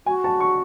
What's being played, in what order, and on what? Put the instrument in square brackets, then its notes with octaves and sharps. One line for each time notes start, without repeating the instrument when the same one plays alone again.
[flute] F#4 [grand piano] G#5
[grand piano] A5
C#6